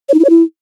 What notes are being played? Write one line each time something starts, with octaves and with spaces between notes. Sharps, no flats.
C#5
D#4
E4
C#5
E4